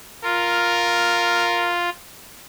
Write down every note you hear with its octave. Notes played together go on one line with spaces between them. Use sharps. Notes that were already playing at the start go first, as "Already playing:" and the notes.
F4 A#4